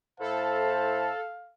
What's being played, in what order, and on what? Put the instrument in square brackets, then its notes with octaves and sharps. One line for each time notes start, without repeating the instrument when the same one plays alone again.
[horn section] A2 E4 C5 [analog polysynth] A4 [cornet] F5 [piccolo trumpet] A5